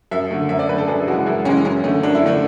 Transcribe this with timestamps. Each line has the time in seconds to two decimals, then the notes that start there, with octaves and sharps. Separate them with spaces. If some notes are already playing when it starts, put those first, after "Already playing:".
0.11 F#2 E5
0.31 D3 A3
0.49 F#2 E5
0.59 D5
0.68 D3 B4
0.72 A3
0.78 A4
0.88 F#2 G#4
1.07 C#3 E3 G#3 F#4
1.26 F#2 E4
1.45 C#3 E3 G#3 C#4
1.65 F#2 C#4
1.84 D3 A3 C#4
2.03 F#2 D4
2.15 E4
2.22 D3 A3 D4